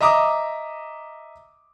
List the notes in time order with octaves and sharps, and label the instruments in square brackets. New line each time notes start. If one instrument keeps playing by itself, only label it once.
[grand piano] D#5 E5 A#5 D6 D#6